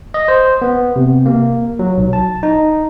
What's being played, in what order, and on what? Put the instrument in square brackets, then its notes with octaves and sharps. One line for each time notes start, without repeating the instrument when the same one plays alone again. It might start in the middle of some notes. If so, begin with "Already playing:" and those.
[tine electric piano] D#5
C5
B3
C3
A#3
F#3
B1
A5
D#4